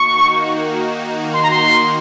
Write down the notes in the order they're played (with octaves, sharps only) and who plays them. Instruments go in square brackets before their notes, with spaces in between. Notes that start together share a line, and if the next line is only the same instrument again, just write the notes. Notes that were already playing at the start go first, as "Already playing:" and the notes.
Already playing: [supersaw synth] D#3 A#3 D#4 F#4 [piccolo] C#6
[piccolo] C6
A#5
C6